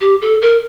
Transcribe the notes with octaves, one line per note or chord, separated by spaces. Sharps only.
G4
A4
A#4